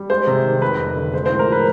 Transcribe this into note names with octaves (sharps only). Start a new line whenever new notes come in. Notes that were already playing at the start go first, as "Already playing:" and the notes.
Already playing: G3
G#3 C5
C3
D#3
F1 B4
F2
D3
G#3 C5
A2 C5
A#4
F3 B4